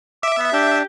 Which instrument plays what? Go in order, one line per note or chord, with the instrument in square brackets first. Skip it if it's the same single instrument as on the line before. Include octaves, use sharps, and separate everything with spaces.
[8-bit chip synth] E5 [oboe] D6
[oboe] B3
[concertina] D4 [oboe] G4